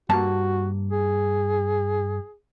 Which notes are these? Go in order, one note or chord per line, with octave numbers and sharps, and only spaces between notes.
G2 A#3 F#4 A5
G#4